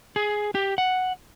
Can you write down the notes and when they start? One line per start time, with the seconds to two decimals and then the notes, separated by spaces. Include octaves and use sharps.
0.16 G#4
0.55 G4
0.78 F#5